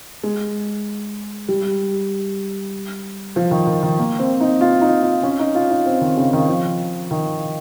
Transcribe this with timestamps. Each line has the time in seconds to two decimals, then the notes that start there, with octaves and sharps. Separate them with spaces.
0.23 G#3
1.48 G3
3.36 F3
3.51 D#3
3.67 D#3
3.83 D#3
3.99 A#3
4.19 C4
4.41 D#4
4.61 F4
4.82 D#4
5.02 F4
5.23 C#4
5.39 D#4
5.55 F4
5.70 D#4
5.86 C4
6.01 D#3
6.17 C#3
6.33 D#3
6.49 F3
7.11 D#3